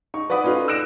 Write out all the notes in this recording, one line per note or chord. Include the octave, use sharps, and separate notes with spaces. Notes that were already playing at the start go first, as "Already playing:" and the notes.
D#4 C#6
B4 D5 F#5 B5 D#6
C#4 D#4 F4 A4 B4
E6 F#6 A#6 D7 E7